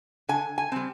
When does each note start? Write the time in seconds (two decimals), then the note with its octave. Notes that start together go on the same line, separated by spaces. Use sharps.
0.29 D3 G#5
0.58 G#5
0.72 G3 C4